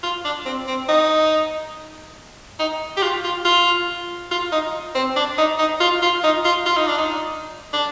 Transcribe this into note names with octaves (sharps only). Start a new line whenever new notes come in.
F4
D4
C4
C4
D#4
D#4
G4
F4
F4
F4
F4
D#4
C4
D4
D#4
D#4
F4
F4
D#4
F4
F4
D#4
D4
D#4
D4